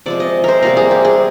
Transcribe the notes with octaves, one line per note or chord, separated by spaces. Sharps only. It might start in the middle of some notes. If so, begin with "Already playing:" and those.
C3 F3 G#3 D5
D#5
A#4 C5
C3 G3 A#3 A#4
G#4
G4
G#4